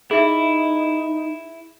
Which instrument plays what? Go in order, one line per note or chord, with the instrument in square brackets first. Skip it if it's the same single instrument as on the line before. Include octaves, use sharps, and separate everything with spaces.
[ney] D#4 [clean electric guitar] E4 [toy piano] G#4 E5